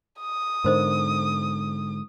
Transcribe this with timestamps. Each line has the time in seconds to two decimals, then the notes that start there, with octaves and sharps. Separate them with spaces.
0.20 D#6
0.64 G#2 D3 A#4 C5 D#5